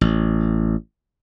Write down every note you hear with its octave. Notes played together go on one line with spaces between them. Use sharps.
A1